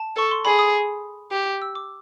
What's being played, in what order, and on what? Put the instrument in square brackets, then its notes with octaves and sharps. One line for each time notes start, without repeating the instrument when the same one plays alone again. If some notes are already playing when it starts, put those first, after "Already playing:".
Already playing: [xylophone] A5
[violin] A4 [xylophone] C#6
[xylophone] C6
[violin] G#4 [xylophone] B5
[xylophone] D#6
[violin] G4
[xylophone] E6
D6